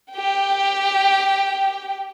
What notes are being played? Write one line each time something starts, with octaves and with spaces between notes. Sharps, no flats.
G4 G5